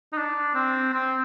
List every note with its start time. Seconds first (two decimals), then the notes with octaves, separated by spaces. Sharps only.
0.13 D#4
0.17 D4
0.54 C4
0.93 C4